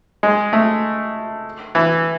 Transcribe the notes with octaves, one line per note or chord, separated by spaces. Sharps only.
G#3
A3
E3